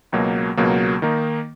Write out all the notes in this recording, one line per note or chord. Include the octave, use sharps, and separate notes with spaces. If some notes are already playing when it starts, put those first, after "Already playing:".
C#2 B2 F#3 A#3
C#2 B2 F#3 A#3
D#3 A#3 D#4